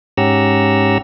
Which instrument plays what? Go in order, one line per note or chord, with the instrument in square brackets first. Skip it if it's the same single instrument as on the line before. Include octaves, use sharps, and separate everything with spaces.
[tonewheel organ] G#2 C#4 G4 F#5 A#5 E6